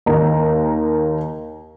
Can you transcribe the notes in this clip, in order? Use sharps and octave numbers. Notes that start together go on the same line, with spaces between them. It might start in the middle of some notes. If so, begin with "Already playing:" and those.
D#2 A#3 D#4 A#5